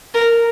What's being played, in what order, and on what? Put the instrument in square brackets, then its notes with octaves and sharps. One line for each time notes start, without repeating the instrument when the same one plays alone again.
[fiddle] A#4